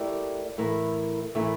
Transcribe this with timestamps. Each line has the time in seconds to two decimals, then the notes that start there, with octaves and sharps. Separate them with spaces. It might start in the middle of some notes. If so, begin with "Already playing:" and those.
Already playing: A3 E4 G4 A#4 D5
0.58 A2 E3 A3 E4 A#4
1.35 A2 E3 A3 E4 A#4